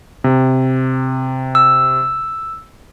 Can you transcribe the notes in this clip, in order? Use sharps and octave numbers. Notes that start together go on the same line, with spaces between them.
C3
E6